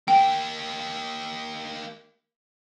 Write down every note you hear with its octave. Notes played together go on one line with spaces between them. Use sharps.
A#3 G4 G5